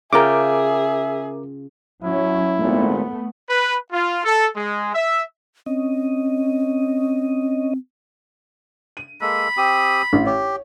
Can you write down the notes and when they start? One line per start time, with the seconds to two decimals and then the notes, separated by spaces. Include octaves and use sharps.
0.13 C#3 F4 G#4 A#4 E5 G5 D6
2.04 F#3 C#4 E4
2.59 G#1 A#2 A3 B3
3.49 B4
3.92 F4
4.25 A4
4.55 G#3
4.95 E5
5.66 C4 C#4 D#5
8.97 D#7
9.21 G#3 A#3 A4 B5
9.57 C4 G4 D#6
10.13 A1
10.26 G4 C#5